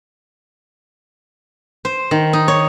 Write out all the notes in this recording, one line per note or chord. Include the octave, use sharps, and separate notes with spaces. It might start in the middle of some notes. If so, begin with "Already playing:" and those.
C5
D#3
D#4
C#5